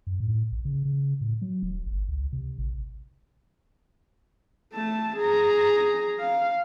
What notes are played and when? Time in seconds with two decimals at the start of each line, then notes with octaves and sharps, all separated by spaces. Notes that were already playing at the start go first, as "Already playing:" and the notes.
0.07 F#2
0.20 A2
0.52 A#1
0.65 C#3
0.85 C#3
1.21 A2
1.42 F#3
1.63 D#1
1.86 G1
2.09 C#2
2.33 C3
2.59 A1
4.73 A3 A5
5.17 G#4 A#5
6.20 F5